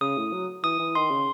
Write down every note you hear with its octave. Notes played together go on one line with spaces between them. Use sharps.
C#3 D#6
A2
F#3
E3 D#6
E3
D#3 C6
C#3